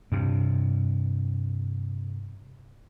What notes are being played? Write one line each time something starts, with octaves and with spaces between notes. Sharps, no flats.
G2 C3